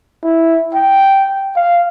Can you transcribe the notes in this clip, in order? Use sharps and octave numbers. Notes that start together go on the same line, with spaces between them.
E4
G5
F5